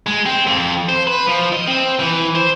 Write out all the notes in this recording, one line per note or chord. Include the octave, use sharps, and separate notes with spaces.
G#3
C4
F2
C5
B4
F3
D#5
C4
E3
C5